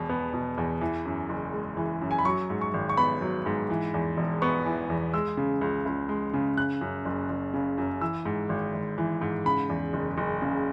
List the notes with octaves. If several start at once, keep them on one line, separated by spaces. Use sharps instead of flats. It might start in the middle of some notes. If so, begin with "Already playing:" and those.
Already playing: E1 E2 B2
B3
B2
E2
E3
F#2
F#1
G#3
E3
F#2
G#5
B5
F#3 C#6
G#2
C#6
G#1
C#6
B3 B5
F#3
G#2
E3
E2
E1
B3 C#6
E3
E2
G#3 E6
C#3
C#2
C#2
G#3
C#3
C#3 F#6
F#2
F#1
F#1
C#3
F#2
E3 E6
G#2
G#1
G#1
E3
G#2
C#3 B5
E2
F#1
F#1
C#3